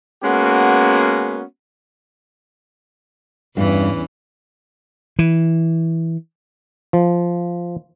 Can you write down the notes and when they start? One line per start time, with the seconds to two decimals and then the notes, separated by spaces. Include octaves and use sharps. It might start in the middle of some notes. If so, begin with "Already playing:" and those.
0.23 G#3 A#3 B3 C#4 F#4
3.57 E2 G2 E3 C#4
5.19 E3
6.93 F3